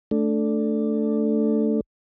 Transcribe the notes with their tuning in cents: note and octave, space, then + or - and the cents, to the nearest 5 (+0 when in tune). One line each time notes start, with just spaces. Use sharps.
A3 +0 D4 +0